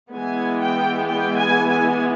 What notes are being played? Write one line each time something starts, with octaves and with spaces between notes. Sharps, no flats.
E3 G#3 B3 G#5
G5
G5
G#5
G#5